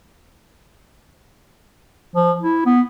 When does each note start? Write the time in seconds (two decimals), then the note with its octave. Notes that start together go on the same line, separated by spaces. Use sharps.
2.15 F3
2.41 E4
2.66 B3